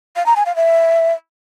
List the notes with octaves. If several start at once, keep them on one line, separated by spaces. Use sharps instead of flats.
F5
A#5
G#5
F5
E5